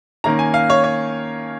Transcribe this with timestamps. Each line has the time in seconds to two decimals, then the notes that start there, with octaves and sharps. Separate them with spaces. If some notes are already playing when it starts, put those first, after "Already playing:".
0.24 D#3 A#3 C#4 A#5
0.39 G#5
0.54 F5
0.70 C#5
0.84 C#5